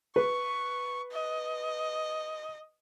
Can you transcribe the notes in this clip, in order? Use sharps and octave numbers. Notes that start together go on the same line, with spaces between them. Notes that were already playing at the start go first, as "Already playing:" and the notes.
B4 C#6
D#5